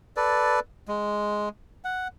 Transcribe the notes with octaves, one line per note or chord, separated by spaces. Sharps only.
A4 B4 D5
G#3
F#5